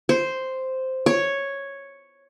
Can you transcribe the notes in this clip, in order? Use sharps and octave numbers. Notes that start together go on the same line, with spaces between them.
C5
C#5